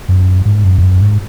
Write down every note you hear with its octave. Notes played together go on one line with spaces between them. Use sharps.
F#2
G#2
F#2
F2
F#2
G#2